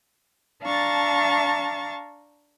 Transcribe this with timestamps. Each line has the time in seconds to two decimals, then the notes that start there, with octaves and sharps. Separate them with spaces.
0.63 D4 F5 A5 A#5 C#6 A6